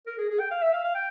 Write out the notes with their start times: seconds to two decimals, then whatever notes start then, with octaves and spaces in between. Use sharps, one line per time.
0.06 A#4
0.18 G#4
0.29 G#4
0.40 G5
0.51 F5
0.62 E5
0.73 F5
0.84 F5
0.95 G5